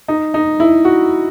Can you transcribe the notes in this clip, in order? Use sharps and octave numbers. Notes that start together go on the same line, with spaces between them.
D#4
D#4
E4
F#4